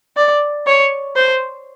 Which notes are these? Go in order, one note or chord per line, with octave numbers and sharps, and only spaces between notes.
D5
C#5
C5